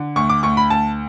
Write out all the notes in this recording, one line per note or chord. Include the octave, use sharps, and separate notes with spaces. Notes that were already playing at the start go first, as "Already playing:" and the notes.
Already playing: D3
D2 C#6
D6
D2 C#6
B5
D2 A5